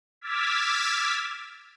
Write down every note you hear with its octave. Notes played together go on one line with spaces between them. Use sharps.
D6 E6 F6 G#6 A6 B6